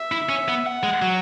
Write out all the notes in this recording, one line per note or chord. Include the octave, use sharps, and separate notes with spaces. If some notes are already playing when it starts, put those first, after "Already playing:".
Already playing: E5
E4
C#4
B3
F#5
G#3
F#3